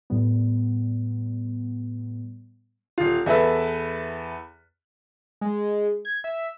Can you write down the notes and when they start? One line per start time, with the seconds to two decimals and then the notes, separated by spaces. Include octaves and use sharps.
0.10 A2 G3 B3
2.98 D#1 F4
3.26 E2 E4 A4 B4 E5 E6
5.41 G#3
6.05 G#6
6.24 E5